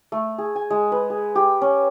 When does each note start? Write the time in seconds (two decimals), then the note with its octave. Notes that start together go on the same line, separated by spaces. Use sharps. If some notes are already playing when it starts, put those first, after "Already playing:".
0.12 A3
0.38 G#4
0.56 G#5
0.70 G#3
0.92 B4
1.10 G#4
1.35 G4
1.62 C#4